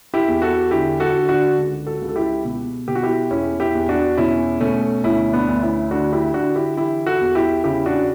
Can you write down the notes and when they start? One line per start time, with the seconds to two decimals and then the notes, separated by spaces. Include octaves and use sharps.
0.14 E4 G4
0.28 E2
0.42 F#4 A4
0.71 D3 E4 G4
1.00 F#4 A4
1.14 D3
1.29 D4 F#4
1.58 C#2
1.86 F#4 A4
2.01 C#2
2.09 A4
2.16 E4 G4
2.45 B2
2.88 B2 G4
2.95 F#4
3.03 E4 G4
3.31 E2 C#4 E4
3.60 E4 G4
3.75 E2
3.89 D4 F#4
4.17 B2 C#4 E4
4.60 B2 A3 C#4
5.04 D2 C#4 E4
5.33 B3 D4
5.48 D2
5.62 C#4 E4
5.91 D3 D4 F#4
6.13 E4 G4
6.34 D3 D4 F#4
6.56 E4 G4
6.77 E3 E4 G4
7.06 F#4 A4
7.21 E2
7.35 E4 G4
7.64 C#3 E4 G4
7.86 D4 F#4